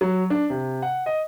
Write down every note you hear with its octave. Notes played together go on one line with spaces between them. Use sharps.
F#3
D4
C3
F#5
D#5